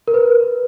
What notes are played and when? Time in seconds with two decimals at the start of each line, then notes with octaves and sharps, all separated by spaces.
0.08 A#4
0.14 B4